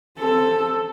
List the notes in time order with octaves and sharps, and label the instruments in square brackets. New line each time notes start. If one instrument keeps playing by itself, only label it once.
[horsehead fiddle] C4 A4